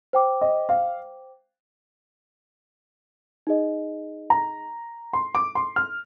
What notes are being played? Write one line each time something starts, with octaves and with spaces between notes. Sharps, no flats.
C5 G5 D6
D#5
F5
D#4 G#4 D#5
A#5
C6
D6
C6
F6